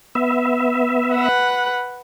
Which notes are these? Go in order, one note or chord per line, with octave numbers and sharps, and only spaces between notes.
B3 E5
B4 F#5